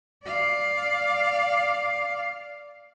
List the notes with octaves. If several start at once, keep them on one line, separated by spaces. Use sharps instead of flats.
D5 F5